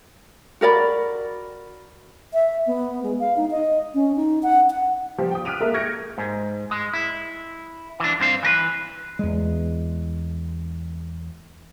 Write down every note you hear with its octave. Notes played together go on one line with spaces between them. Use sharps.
F#4 A#4 D5 B5
E5
B3
G#3
F5
D#4
D#5
C#4
D#4
F#5
F#5
F3 G3 G4
G5 D#6
F6 F#6 B6 D7 D#7 F7
G#3 A#3 A4 A#4 E5
F6 G6 G#6 A#6 C#7 D7
G#2
G#3
E4
E3 D4
G2 C4 F5
E3 A#4 B4
E2 G#3